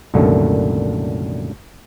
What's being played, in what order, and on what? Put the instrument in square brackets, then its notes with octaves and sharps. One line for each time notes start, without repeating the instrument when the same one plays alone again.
[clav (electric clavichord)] C2 F#2 A#2 D3 D#3 A3